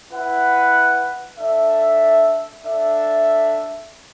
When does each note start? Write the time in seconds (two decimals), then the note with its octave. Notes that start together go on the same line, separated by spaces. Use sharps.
0.10 E4 B4 F#5
1.37 D4 A4 E5
2.65 D4 A4 E5